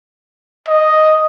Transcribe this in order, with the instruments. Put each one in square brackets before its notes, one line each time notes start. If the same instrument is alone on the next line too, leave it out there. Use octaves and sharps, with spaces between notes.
[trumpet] D#5